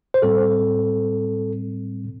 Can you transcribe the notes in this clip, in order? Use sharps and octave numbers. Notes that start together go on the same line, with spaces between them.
C5
A2 G3 C4 A4